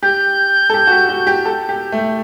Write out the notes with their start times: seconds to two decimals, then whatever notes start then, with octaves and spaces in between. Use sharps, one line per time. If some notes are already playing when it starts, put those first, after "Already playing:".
0.03 G4 G6
0.70 A4
0.74 G4
0.87 F#4
0.92 G4
1.09 F#4
1.27 G4
1.45 A4
1.69 G4
1.92 A3